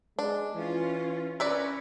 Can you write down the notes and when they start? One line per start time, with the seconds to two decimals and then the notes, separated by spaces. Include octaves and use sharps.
0.19 G#3 D4
0.55 E3 C#4 F4
1.40 C#4 E4 A#4 B4 C#5 D5